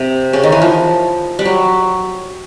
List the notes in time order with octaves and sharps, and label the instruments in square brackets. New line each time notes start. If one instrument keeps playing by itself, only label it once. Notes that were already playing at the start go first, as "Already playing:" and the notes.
Already playing: [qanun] C3
C#3
D#3
E3
F3
G3
F#3